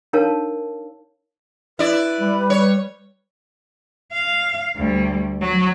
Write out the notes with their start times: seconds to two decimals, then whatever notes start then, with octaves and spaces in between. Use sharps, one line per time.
0.13 D4 D#4 A#4 C#5 F5 A5
1.79 E4 B4 D5
2.21 G3
2.50 C#5
4.12 F5
4.75 D2 G3
5.41 F#3